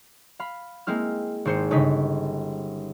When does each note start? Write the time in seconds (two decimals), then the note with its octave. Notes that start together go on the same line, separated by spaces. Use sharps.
0.40 F5 B5
0.87 G#3 A#3 C4 E4 F6
1.45 G#1 C5 C#7
1.71 G1 C#3 D#4 B6